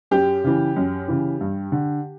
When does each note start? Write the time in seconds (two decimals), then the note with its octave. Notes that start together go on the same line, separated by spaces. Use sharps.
0.11 F#2 G4
0.44 C#3 E3
0.76 F#2
1.08 C#3 E3
1.40 G2
1.72 D3